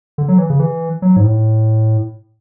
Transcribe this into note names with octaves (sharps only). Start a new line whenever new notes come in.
D3
F#3
E3
C#3
E3
F#3
G#2
A2